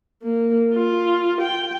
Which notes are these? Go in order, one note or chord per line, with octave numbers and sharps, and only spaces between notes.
A#3
F4
G5